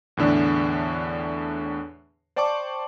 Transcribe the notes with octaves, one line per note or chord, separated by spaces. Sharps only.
E2 A2 D3 D4
C5 D5 G5 A5 C#6 D6